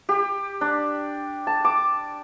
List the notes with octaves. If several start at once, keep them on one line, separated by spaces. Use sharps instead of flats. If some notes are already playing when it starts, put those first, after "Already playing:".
G4
D4
A5
D6